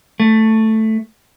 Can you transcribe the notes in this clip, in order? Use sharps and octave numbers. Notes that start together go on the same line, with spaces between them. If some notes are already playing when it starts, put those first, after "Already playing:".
A3